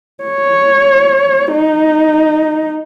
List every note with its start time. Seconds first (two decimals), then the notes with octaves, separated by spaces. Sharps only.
0.24 C#5
1.52 D#4